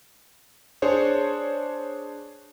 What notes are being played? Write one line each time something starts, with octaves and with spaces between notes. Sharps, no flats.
D4 G#4 C5 C#5